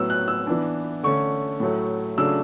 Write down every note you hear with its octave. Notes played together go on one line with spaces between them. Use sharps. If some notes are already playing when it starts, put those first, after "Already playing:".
Already playing: A2 F#3 B3 E6
F#6
E6
E3 B3 D4
D3 A3 C#4 C#6
A2 F#3 A3
C#3 F#3 A3 D4 E6